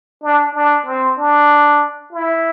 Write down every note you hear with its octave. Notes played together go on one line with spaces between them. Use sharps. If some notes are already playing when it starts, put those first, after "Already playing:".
D4
D4
C4
D4
E4